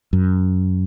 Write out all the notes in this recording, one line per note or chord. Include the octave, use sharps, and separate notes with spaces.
F#2